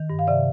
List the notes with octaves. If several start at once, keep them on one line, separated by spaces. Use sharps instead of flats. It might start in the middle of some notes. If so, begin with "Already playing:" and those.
Already playing: D#3
G2
F5
C3 D5 E5